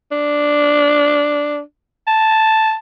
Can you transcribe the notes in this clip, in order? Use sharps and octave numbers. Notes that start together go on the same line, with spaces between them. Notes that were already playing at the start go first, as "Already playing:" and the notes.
D4
A5